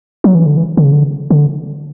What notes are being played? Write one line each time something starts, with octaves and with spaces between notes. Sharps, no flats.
F#3
E3
D3
E3
D3
C#3
D3
D3